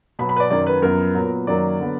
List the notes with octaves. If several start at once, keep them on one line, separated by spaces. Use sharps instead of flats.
B2 F#3 B3 B5
B5
B4
D5
F#2 D#3 F#3 D5
B4
F#2 F3 B3 A#4
A#2 F#3 B3
F#2 D#3 F#3 A#3 D5
D3 F#3 B3